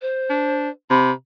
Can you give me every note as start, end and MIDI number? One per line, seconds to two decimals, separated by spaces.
0.01 0.69 72
0.30 0.69 62
0.90 1.12 48
0.90 1.11 83